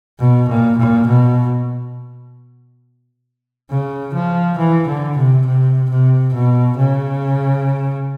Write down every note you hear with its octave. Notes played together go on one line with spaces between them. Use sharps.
B2
A#2
A#2
B2
C#3
F3
E3
D3
C3
C3
C3
B2
C#3